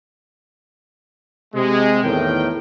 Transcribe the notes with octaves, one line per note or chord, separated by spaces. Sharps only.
C3 G#3
E2 A2 D#3 A#4 G5